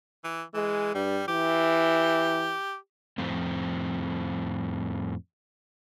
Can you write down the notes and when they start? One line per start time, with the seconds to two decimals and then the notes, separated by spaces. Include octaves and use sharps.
0.24 E3
0.54 E3 G#3
0.95 G2 G3
1.28 E3 G4
3.18 F2 A2 C4